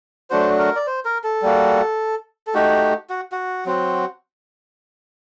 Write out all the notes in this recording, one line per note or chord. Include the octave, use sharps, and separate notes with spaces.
F#3 A3 D4 F#4 C5
A#4
D5
C5
A#4
A4
G3 A#3 F#4
A4
A3 D#4 F#4 G4
F#4
F#4
F#3 C4 F#4